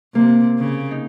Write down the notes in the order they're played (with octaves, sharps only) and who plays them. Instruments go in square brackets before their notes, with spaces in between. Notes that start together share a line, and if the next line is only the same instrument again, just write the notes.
[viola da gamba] C3 [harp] A#3
[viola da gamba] C#3
[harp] D#4